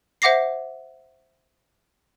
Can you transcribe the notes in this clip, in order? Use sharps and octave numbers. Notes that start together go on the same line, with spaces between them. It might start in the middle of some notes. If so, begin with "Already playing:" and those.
C5 E5 F#5 D6 A#6 C7